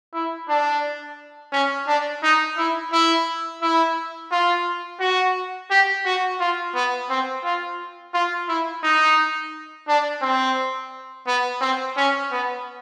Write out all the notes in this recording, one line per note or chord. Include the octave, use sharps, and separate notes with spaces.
E4
D4
C#4
D4
D#4
E4
E4
E4
F4
F#4
G4
F#4
F4
B3
C4
F4
F4
E4
D#4
D4
C4
B3
C4
C#4
B3